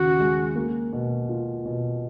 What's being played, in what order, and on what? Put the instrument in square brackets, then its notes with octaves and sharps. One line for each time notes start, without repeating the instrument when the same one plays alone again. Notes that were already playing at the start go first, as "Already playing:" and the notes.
Already playing: [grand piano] D#2 C#3 [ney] F#4
[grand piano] G#3
A#3
B2
F4
B2